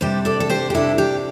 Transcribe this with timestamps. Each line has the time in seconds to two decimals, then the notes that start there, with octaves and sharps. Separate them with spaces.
0.01 C3 G3 D4 G4 C5
0.25 A4 D5
0.40 A4
0.49 G4 C5
0.70 G4
0.74 C3 G3 D4 E4 A4
0.98 G4